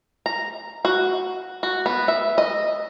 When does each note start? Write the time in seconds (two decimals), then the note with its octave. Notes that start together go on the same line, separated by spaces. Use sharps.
0.26 A#5
0.85 F#4
1.63 F#4
1.86 B3
2.08 E5
2.38 D#5